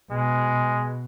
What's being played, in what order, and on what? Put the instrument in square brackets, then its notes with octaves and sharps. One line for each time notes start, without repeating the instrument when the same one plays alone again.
[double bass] B2 [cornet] G#3